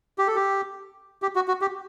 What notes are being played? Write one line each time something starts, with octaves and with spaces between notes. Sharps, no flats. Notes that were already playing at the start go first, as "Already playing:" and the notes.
G4
A4
G4
G4
F#4
F#4
G4